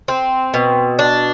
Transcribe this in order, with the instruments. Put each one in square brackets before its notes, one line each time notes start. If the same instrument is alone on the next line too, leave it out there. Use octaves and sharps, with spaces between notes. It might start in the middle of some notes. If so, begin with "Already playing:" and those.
[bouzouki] C4
B2
D4